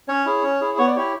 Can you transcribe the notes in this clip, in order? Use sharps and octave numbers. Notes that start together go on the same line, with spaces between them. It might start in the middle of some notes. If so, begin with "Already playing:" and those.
C#4 C#5
E4 G#4
C#4
E4 G#4
B3 C#5
D5
E4 G4 C#5